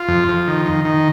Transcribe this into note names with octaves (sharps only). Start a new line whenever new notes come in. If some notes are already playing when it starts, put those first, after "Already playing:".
Already playing: F4
F2
F2
D#3
D#3
D#3